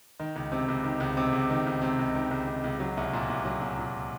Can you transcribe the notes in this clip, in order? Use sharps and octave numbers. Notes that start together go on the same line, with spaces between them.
D#3
C#2
C3
C#2
D#3
C#2
C3
C#2
D#3
C#2
C3
C#2
D#3
C#2
C3
C#2
F#3
C2
A#2
C2
F#3
C2
A#2